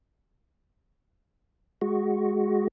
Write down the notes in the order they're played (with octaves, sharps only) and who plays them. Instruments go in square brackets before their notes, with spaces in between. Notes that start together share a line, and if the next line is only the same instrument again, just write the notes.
[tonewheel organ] G#3 F#4